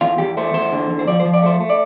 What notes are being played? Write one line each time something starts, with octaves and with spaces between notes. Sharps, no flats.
E2 F4
E2 G4
A3 C5
E2 C5
D3
E2
C5
F3 D5
C5
F3
D5
A3 C5
A3
D5